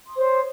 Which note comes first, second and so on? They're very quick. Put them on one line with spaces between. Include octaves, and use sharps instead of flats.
C6 D#6 C5 C#5